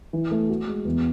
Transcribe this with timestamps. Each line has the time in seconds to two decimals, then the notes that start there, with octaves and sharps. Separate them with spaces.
0.13 E3
0.31 A3
0.49 F#4
0.67 G#3
0.85 E2